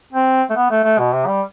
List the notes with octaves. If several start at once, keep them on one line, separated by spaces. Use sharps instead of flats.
C4
A3
B3
A3
A3
B2
C3
G3